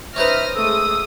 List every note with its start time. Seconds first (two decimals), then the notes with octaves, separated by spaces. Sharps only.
0.16 C#4 D#4 B4 C5 E5 D#6 F6 A#6
0.55 G#3 A3 D#6 E6